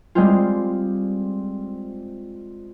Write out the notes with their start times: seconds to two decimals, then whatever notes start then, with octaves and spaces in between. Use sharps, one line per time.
0.15 G3 G#3 C4 F4